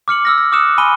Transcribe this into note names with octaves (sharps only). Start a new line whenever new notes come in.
D6 F6 C#7 F#7
E6 F6 A#6
F6
D6 D#6 F6 F#6 C#7 E7
G#5 B5 C6 D#7 G7